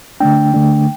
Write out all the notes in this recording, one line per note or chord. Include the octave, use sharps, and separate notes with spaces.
D3 A3 D4 G5
D3 A3 D4